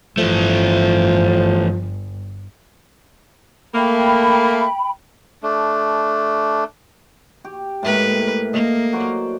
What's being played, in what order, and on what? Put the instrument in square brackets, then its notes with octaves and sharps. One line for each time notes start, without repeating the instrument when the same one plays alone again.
[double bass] G1 [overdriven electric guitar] E3 A3 [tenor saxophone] F3
[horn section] A3 A#3 [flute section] G5 B5
[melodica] A3 D4
[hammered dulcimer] G4
[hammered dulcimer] A2 A#3 [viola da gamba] G#3 B4
[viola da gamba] A#3 [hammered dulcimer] D#5
[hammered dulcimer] F#3 C5 D5